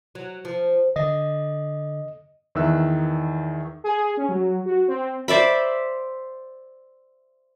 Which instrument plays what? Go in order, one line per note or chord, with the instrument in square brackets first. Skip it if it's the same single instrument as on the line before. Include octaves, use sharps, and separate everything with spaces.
[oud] F#3
F3
[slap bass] D3 [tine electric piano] D#5
[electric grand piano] E2 D#3 E3 E5 E6 F#6
[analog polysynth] G#4
C#4
F#3
F#4
C4
[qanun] C5 D5 E5 B5